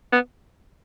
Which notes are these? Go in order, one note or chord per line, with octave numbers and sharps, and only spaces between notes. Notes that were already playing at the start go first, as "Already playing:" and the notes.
B3